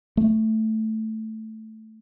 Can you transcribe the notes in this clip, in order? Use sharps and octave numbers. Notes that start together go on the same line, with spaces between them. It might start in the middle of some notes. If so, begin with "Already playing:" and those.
A3